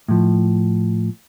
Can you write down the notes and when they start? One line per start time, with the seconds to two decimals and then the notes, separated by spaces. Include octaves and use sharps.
0.08 A2 F3